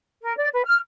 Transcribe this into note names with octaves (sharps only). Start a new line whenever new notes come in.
A#4
D5
B4
F6